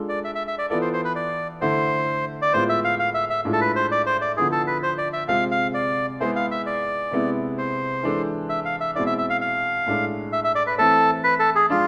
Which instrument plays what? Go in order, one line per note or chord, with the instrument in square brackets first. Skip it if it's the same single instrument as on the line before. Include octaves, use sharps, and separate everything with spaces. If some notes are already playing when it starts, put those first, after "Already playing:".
Already playing: [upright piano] G#3 D4 F4 A4
[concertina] D5
E5
E5
E5
D5
[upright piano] E3 B3 F4 A4 [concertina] D5
[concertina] C5
C5
B4
D5
[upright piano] D3 A3 E4 [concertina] C5
[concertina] D5
[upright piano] A2 G#3 B3 F4 [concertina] C5
[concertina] E5
F5
F5
E5
E5
[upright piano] A2 G#3 D4 F4
[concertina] A4
B4
C5
D5
C5
D5
[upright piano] D3 F3 B3 E4 [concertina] G#4
[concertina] A4
B4
C5
D5
E5
[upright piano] C3 G#3 C4 F4 G#4 [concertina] F5
[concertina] F5
D5
[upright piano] G#3 B3 E4 G#4 [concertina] C5
[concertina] F5
E5
D5
[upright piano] C3 G#3 B3 E4
[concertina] C5
[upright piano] E3 G#3 D4 A4
[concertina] E5
F5
E5
[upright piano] B2 G#3 C4 E4 [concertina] D5
[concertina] E5
E5
F5
F5
[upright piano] A2 G#3 D4 A4
[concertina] E5
E5
D5
B4
[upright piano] E3 A3 C4 [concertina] A4
[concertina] B4
A4
G#4
[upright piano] F3 G#3 D4 [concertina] F4